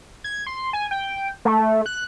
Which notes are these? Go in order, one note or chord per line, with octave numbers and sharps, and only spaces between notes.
G#6
C6
G#5
G5
A3
F#6